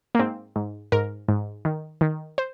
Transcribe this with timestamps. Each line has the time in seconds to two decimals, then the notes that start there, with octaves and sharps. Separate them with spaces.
0.15 A#3
0.19 G#2 C4
0.56 G#2
0.92 G#2 A#4
1.28 G#2
1.65 D#3
2.01 D#3
2.38 C5